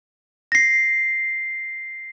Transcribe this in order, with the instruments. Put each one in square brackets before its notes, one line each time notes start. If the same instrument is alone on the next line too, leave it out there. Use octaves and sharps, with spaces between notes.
[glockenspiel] A#6 C7